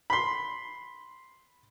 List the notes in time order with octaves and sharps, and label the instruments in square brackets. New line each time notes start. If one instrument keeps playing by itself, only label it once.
[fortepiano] B5 C6